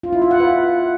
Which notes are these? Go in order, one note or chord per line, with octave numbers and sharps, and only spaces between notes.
F4
E4
F4
F#5
B4